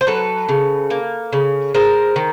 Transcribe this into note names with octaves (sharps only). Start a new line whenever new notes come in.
C5
F#3 A4 B4
C#3
A#3
C#3
G#3 A#4 C5
D#3